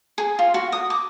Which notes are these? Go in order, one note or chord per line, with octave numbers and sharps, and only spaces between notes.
G#4
F4
F#4
D#6
D6